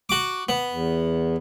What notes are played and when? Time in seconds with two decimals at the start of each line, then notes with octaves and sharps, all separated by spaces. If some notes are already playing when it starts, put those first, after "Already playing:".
0.09 F#4 D6
0.49 B3
0.70 E2